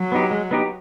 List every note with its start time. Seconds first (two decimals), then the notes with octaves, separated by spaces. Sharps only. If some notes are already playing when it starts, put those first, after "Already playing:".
Already playing: F#3
0.12 B3 D#4 G4
0.31 G#3
0.51 B3 D#4 G4